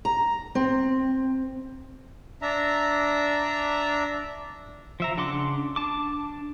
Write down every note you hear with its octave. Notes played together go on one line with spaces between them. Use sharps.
A#5
C4
D4 E5 A#5
F3 E5 A#5
C#3 D4 F#5 C6 D6
D4 A5 D6